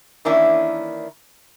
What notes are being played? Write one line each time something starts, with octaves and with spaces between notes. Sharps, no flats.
D#3 E3 A#3 C#4 D4 E4